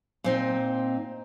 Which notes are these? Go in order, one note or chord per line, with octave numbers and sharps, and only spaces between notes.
A#2 C4 D#4